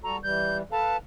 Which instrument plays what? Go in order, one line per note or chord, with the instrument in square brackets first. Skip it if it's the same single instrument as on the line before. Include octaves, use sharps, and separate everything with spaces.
[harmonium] G3 F#4 A4 [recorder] A#5
[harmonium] E3 G3 [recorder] G6
[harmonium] A4 B4 F5 [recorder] A5